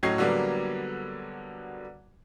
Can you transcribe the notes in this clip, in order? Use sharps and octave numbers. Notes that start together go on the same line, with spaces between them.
A2 F#3 C#4 D#5 G#6 C7
D3 F#3 G3 A#3 B3